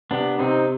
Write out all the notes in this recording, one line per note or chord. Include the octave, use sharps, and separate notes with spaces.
C3 B3 D4
C3 C4 D#4